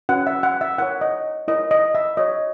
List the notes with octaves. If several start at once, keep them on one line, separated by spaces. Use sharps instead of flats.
C#4 F#4 B4 F#5
E5
F#5
E5
E4 A#4 C#5 F#5
D#5
E4 A#4 C#5 D#5
D#5
E5
F#4 C#5 D#5